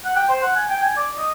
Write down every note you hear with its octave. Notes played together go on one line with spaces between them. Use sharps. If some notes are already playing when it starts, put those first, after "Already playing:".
F#5
G5
C5
F#5
G#5
G5
G#5
D5
D#5